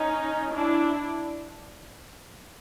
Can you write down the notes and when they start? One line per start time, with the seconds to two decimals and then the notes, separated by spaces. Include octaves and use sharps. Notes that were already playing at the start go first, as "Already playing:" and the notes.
Already playing: C#4 D#4
0.54 D4 E4